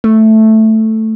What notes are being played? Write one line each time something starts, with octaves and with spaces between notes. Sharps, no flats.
A3